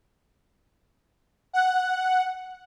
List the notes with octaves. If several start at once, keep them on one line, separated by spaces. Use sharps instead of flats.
F#5